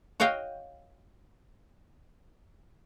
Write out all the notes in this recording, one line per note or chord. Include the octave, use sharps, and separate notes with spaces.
F#4 C#5 D#5 F5 G5